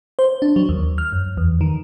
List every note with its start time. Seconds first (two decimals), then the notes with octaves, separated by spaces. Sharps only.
0.19 C5
0.42 D4
0.56 F#3
0.69 D#2
0.98 F6
1.13 F#2
1.37 E2
1.61 D#3